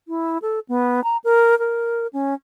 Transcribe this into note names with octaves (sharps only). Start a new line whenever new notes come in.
E4
A4
B3
A#5
A#4
A#4
C#4